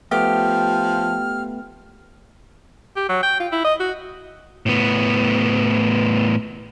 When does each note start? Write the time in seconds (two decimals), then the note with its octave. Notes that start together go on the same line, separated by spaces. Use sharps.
0.11 F3 A3 B3 G4 F6
2.97 G4
3.09 F#3
3.23 G5
3.40 F4
3.52 E4
3.65 D#5
3.80 F#4
4.66 A2 B3